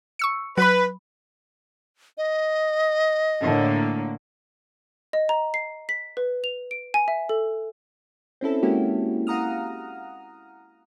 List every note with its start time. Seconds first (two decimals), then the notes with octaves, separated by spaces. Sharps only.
0.19 C#6 E6 C#7
0.58 F#3 B4 B5
2.18 D#5
3.41 A2 D3 A#3
5.13 D#5
5.29 A#5
5.54 C7
5.89 B6
6.17 B4
6.44 F7
6.71 D7
6.94 G#5
7.08 E5
7.29 A4
8.41 C4 C#4 E4 A4
8.63 G#3 A#3 C#4 E4 F#4 G4
9.27 F5 F#5 A#5 D#6 F6